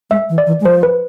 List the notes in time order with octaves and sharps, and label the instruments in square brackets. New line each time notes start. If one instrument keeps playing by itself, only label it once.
[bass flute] G#3 [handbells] E5
[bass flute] E3
[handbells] D5
[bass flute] E3
G#3
[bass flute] F3 [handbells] C5
[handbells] B4